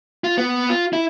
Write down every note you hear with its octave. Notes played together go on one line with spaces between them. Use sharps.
F4
B3
F4
E4